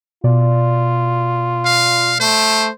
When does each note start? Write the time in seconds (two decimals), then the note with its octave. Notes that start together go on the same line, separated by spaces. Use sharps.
0.24 B2 F4 D5
1.65 F5
2.20 A3 C5